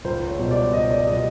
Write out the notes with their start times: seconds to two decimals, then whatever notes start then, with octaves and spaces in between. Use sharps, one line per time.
0.05 C#2 C5
0.28 C#5
0.39 B2 G3
0.51 D5
0.73 C#2 D#5
0.90 D5
1.06 B2 G3 D#5